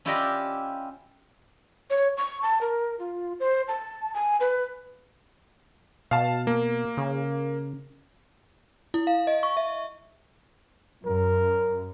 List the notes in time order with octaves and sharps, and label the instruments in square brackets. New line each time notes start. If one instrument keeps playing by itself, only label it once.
[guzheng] C#4 E4 F4 G4 D5 D#5
[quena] C#5
C#6
A5
A#4
F4
C5
A5
G#5
B4
[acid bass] B2 [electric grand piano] F5 A5
[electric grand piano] A#3
[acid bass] C#3
[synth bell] E4
F5
D#5
C#6
E5
[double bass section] F#2 [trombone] A#4